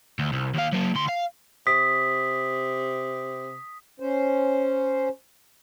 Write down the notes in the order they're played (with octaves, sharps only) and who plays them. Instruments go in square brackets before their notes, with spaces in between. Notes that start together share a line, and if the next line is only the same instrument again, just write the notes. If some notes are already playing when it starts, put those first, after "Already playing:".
[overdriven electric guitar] D2
C2
D#2 F5
F#3 A#3
D2 C6
F5
[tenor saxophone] C3 [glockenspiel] D#6 B6
[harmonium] C#4 C5